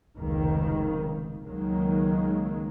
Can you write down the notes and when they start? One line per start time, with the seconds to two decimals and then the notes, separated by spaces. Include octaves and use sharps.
0.16 F1 C#2 D#3 A#3
1.45 C#2 D#3 F#3 G#3 A#3